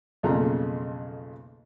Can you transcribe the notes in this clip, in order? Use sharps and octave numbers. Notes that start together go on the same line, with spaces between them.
B1 F2 C#3 A3 A#3 A#5